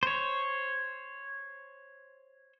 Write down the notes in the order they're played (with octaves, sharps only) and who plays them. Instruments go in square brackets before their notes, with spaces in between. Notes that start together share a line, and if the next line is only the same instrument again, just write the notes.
[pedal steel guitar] C5 C#5